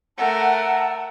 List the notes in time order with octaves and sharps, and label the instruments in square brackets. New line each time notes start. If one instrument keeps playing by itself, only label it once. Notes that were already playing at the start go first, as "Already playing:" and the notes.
[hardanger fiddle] A3 A#4 [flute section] F#5 A5 E6